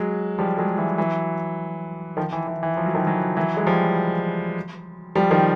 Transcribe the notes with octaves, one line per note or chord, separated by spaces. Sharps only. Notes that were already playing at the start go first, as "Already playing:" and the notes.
Already playing: F#3 G#3
F3 G3
F#3 G#3
E3 F#3
E3 F#3
D#3 F3
E3
E3
E3
F3
F#3
D#3 F3
E3 F#3
E3 F#3
G#3
F3 G3
F3 G3
D#3 F3